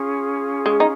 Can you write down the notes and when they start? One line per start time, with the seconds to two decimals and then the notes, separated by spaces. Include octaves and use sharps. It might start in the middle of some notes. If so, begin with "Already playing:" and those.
Already playing: C#4 F4 G#4
0.66 G#3
0.80 D#4